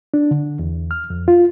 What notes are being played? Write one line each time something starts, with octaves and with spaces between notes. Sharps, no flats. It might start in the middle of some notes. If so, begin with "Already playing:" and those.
D4
D3
E2
F6
F2
F4